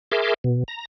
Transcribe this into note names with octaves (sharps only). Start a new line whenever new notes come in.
G#4 A#4 E5 C6 D6
B2
A#5